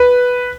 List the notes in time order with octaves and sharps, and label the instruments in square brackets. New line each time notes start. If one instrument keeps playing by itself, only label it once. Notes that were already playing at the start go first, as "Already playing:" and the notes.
Already playing: [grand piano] B4